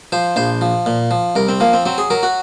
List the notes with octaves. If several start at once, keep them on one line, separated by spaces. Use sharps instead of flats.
F3 C5
A#1 C5
F3
A#2
F3
C2 A#4
C4
F3 A#3
C4
F#3 C4
G#4
F#3 A#4
F#4